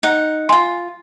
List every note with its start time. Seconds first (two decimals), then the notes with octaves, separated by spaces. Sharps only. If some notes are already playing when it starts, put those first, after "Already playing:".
0.03 D#4 F#5
0.49 D#4 F4 G#5 C6